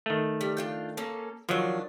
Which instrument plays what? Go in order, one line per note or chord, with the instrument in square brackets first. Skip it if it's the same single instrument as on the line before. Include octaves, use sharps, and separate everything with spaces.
[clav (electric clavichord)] D#3 A3
[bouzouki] G3
D4 F4 G5
A#3 C#4 A4
[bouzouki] D#3 D4 [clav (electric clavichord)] F3 F#3